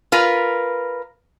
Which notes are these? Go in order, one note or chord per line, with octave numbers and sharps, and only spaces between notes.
F4 A#4 B4